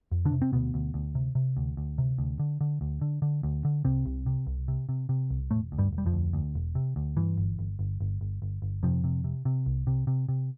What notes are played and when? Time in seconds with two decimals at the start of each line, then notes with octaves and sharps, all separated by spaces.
0.11 F2
0.25 D3 D4
0.32 C3
0.42 C4
0.52 D2 B2 B3
0.74 D2
0.94 D2
1.15 C3
1.35 C3
1.57 D2
1.77 D2
1.98 C3
2.18 D2
2.39 D3
2.61 D3
2.81 D2
3.01 D3
3.22 D3
3.43 D2
3.65 D3
3.85 C2 C3 C4
4.06 C2
4.26 C3
4.47 C2
4.68 C3
4.89 C3
5.09 C3
5.30 C2
5.51 E1 A2 A3
5.72 D2
5.78 G2 G3
5.93 E1
5.98 G3
6.06 F2 F3
6.13 D2
6.33 D2
6.55 E1
6.75 C3
6.96 D2
7.17 G2 E3
7.38 G1
7.59 G1
7.79 G1
8.00 G1
8.21 G1
8.42 G1
8.62 G1
8.83 F2 C3 F3
9.04 C3
9.24 C3
9.45 C3
9.66 C2
9.87 C3
10.07 C3
10.28 C3